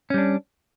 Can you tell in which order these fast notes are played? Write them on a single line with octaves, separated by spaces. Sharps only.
C#4 G3 D4